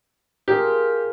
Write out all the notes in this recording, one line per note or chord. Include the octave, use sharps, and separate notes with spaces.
F4 G4 G#4 A#4